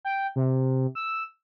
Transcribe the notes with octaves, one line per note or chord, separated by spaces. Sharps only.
G5
C3
E6